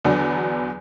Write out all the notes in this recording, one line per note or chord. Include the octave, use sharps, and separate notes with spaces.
E2 D3 F#3 B3 D4